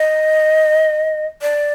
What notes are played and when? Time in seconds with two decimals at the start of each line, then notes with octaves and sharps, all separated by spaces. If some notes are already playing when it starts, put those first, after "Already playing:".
Already playing: D#5
1.42 D5